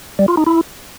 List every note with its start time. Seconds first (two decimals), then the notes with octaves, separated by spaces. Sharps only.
0.19 G3
0.28 F4
0.37 D#4
0.47 E4